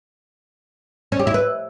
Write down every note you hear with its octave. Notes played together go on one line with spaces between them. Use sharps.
C#4
G4
E4
B4